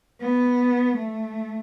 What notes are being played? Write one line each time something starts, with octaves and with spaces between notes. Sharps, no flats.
B3
A3